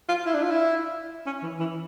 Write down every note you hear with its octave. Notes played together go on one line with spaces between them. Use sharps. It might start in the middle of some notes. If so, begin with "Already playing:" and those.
F4
E4
D4
F4
E4
C#4
E3
E3